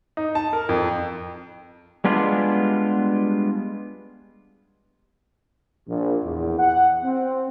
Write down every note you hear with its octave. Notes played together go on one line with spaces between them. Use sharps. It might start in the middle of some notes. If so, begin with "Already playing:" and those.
D#4
A5
A#4
F2
G3 G#3 B3 D4 F4
A#1
E2
F#5
C4